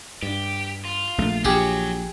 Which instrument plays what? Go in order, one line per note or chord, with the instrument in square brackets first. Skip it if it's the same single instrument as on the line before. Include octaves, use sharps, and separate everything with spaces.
[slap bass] G2 [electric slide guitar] G4
[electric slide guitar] F4
[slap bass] A#1 A3
[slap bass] A#1 [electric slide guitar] F#3 [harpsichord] G4 G#4